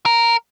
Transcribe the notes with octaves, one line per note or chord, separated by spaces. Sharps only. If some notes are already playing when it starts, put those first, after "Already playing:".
A#4